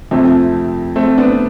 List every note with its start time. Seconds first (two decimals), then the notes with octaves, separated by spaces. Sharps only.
0.11 F2 C3 F3 A3 C4
0.96 A3 C4
1.18 B3 D4